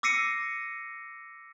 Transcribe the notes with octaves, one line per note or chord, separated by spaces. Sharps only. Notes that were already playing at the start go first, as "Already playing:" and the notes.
D6 E6 A#6 C7 C#7 D#7